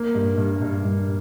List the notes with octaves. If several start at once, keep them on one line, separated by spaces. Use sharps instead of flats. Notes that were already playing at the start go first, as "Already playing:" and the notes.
Already playing: A#3
G2
G2
G2
G2